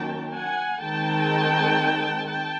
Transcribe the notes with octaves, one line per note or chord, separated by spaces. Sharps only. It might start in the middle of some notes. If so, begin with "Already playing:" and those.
Already playing: D#3 F#3 A#3 C#4 G5 A5
F#5 G#5
D#3 G#3 C4 G5 A5
G5 A5